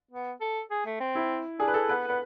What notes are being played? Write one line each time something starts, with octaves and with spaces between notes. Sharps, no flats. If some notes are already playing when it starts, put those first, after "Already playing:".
B3
A4
G#4
A3
C4
E4
D4 G#4
B4
A4
B3 B4
B3 B4